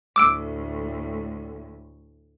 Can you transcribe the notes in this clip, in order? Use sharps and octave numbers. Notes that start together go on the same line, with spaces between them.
D2 A2 D6 E6 D7